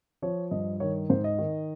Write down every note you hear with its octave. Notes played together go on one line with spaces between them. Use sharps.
F3 C#5
G2 D#5
D#3 C#5
G#2 C5
D#5
D#3